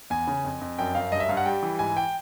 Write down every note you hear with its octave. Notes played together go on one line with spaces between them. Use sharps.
E2 G#5
C#3
F2
F2
F#2 G5
F#2 F5
G2 D#5
E5
G2 F5
F#5
G3 G5
E3
G#2 G#5
G5